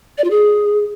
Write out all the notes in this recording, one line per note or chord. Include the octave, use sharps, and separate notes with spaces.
D5
F4
G#4